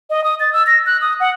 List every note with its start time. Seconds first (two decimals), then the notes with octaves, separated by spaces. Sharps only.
0.10 D#5
0.24 D#6
0.40 A6
0.53 E6
0.67 A#6
0.86 F#6
1.01 D#6
1.20 F#5